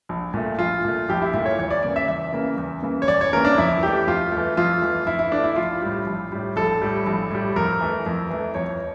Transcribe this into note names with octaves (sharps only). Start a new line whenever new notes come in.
A#1
A#2 A3
A#1 F4
A#2 A3
A#1 G4
E4
A#2 A3 E4
C#5
E2 C#5
D5
C#3 E3 A#3 D5
E5
E2 E5
C#3 E3 A#3
E2
C#3 E3 A#3
C#5
E2 D5
C#5
C#3 E3 A#3 A#4
D4
F2 E4
E3 A3 G4
F2 F4
A3
E3
F2 F4
E3 A3
F2 E4
E4
E3 A3 D4
E4
A#1 F4
A2 G3
A#1
A2 G3
A#1 A4
A2 G3
A#1
A2 G3
F2 A#4
E3 A3
F2
E3 A3
F2 C#5